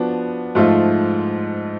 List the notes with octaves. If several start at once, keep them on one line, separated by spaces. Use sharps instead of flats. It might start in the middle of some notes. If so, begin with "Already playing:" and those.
Already playing: F3 B3 D4 F#4
G#2 F3 A3 F4